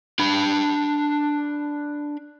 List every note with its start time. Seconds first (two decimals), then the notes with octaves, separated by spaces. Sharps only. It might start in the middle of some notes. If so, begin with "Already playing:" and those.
0.19 D4 B5